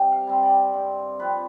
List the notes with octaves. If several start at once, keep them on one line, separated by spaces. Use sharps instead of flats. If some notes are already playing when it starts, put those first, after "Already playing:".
Already playing: C3 G3 G5
F5
G3 C4
D5
G2 C5
F3 C4 B4
C5